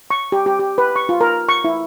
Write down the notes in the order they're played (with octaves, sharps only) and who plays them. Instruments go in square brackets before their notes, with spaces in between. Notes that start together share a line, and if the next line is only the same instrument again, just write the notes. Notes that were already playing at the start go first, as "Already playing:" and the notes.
[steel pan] C#6
G4
G4
G4
B4
C#6
F4
A#4
C#6
E4